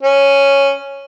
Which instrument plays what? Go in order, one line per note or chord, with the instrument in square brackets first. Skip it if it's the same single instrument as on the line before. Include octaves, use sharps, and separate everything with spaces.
[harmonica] C#4